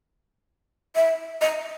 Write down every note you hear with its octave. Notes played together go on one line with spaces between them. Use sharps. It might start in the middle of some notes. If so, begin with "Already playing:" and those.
E5
D#5